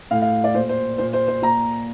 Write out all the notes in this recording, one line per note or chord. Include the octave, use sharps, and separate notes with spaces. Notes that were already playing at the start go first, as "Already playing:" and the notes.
A2 F5
F5
D5
A#2 C5
C5
A#2 C5
C5
C5
A#2 A#5